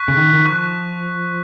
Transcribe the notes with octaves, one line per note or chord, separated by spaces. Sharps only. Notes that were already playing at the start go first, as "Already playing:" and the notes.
Already playing: C#6 F#6 B6
C#3
D#3
D#3
F3 C#6 F#6 B6